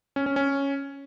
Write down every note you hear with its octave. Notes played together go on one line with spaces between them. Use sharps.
C#4
C#4
C#4